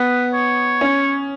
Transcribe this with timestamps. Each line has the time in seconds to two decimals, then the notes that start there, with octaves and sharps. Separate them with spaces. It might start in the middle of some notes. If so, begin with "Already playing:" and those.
Already playing: B3 B4
0.33 C#5
0.81 C#4